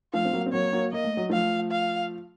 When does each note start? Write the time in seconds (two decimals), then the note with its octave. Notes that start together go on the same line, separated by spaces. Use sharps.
0.14 F3 A3 F5
0.25 C4
0.33 F#3 A#3
0.46 C4
0.53 F#3 A#3 C#5
0.73 F#3 A#3
0.93 A#3 D#5
1.04 A3
1.17 F#3
1.29 F3 A3 F5
1.71 F5